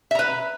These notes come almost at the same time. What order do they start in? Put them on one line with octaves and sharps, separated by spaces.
E5 A#5 B4